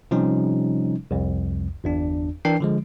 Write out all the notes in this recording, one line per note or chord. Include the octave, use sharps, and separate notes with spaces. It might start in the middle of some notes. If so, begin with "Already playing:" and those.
C3 F3 G3 C#4 D#4
C2 F2
G1 E2 D4
E3 D4 A#4 G5 C7
D3 F3 G#3